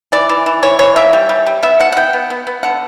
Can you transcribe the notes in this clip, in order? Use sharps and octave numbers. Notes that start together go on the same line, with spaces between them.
E3 D5
E3
E3
E3 C#5
E3 C#5
A#3 E5
G3
G3
G3
B3 E5
B2 F#5
F#5
B3 G5
B3
B3
B3
D3 F#5